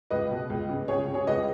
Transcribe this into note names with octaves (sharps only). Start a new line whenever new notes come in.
C#2 B4 D#5
B2
C#2
C#3
C#2 G#4 C#5
C#3
G#4 C#5
C#2 B4 D#5